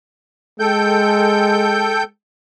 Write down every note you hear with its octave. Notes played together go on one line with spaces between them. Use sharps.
G#3 A4 G5 G6